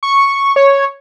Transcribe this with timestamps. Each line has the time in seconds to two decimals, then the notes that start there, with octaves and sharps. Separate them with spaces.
0.03 C#6
0.56 C#5